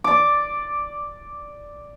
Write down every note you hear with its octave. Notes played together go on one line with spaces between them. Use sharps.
D5 D6